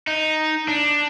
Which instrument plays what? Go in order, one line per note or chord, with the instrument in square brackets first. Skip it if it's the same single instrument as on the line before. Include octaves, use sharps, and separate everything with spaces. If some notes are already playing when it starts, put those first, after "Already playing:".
[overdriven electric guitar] D#4
D4